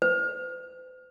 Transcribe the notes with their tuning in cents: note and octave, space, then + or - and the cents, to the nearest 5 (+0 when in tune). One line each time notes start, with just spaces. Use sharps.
C5 -45